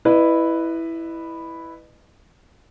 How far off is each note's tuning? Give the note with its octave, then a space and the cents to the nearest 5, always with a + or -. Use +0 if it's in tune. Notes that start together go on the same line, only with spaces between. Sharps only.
E4 +0 B4 +0 D#5 -40